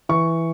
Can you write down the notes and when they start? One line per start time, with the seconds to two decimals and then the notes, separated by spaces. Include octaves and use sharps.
0.09 E3 C#6